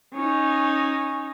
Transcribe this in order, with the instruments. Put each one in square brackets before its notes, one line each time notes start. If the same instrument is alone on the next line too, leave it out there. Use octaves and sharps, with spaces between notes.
[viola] C#4 D#4